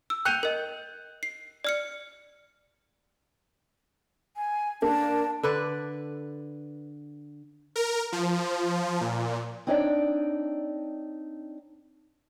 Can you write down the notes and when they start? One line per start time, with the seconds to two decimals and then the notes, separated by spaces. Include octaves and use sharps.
0.10 E6
0.25 G5 F#6 G6 C#7 D#7 F7
0.43 A#4 D#5
1.23 C7
1.64 D5 F6 C#7
4.37 G#5
4.82 A#3 D4 A5
5.43 D3 B4 D5
7.76 A#4
8.12 F3
9.01 A#2
9.67 C4 D4 D#4 C#5 D5 G5